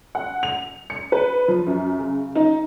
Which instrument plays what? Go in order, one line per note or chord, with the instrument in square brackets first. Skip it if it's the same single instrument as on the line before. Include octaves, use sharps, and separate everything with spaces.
[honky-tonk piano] F#5
F7
C#7
B4
F3
F#2
C#3
D#4